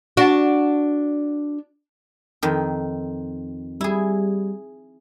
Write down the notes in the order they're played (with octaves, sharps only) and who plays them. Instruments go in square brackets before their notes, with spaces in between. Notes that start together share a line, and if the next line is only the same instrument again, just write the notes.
[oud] D4 F#4
[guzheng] F2 D#3
[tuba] G3 [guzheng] E4 G#4